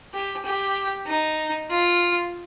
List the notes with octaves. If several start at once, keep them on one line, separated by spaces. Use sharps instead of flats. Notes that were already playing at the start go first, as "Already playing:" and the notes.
G4
G4
D#4
F4